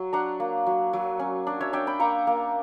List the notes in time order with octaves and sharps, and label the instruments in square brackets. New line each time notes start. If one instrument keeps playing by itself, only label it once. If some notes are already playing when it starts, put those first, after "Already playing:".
Already playing: [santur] F#3
D4 F#5 A#5
A#3
F#3
F#3
C#4
D4
C#5 E5
D4 E5 G5
G5 B5
A#3 A#5 C#6
A#3